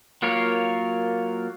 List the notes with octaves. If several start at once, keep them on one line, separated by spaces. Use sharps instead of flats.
F#3 A#3 F4 A#4 C#5